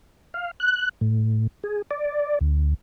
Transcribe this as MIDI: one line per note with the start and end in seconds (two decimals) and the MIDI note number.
0.34 0.51 77
0.60 0.89 90
1.01 1.47 45
1.63 1.82 68
1.91 2.39 74
2.41 2.74 38